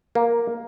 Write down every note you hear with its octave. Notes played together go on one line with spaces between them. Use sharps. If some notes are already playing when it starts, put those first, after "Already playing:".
A#3